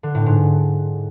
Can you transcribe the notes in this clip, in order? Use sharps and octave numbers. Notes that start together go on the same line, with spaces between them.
D3
A2
G#2